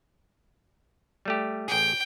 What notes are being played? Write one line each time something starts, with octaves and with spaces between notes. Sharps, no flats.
G3 A3 G4
A1 G#4 G5